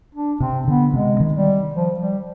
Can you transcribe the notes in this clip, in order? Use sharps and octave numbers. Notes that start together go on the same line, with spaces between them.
D4
C3 C4
D3 B3
C3 G#3
D#3
G3
F3
G3